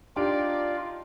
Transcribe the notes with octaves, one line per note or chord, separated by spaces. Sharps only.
D4 D#4 F4 G4 D5 D7